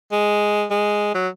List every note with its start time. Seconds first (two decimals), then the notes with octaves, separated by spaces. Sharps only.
0.12 G#3
0.70 G#3
1.15 F#3